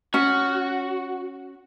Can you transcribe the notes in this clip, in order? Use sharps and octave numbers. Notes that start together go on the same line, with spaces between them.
C#4 F#4